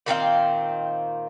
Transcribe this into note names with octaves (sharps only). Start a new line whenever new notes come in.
A#2 D#3 C4 F5